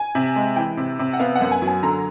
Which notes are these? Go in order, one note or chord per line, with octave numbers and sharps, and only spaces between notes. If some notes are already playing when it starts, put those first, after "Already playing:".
Already playing: G#5
C3
G#3
E3 G5
C3
C3
F#5
B3 F5
F#5
F#2
G#5
F#3
G#5
D3 A#5